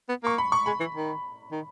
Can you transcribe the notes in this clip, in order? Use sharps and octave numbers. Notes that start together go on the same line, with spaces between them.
B3
A#3 C#6
B5
C#6
G#3 B5
E3
D#3
D#3